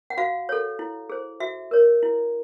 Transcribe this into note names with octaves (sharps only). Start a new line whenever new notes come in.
F#5
F#4 F5
A4 C#5
E4
G#4 C5
F#4 E5
A#4 C#5
E4